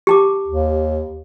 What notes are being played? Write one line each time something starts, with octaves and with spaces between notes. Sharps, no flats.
G4 A5 D6
D#2